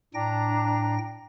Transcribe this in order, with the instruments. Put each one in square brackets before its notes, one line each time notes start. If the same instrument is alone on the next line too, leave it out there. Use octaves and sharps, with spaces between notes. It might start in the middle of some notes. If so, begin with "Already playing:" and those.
[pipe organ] A2 G5 A#6 [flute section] D4 A#5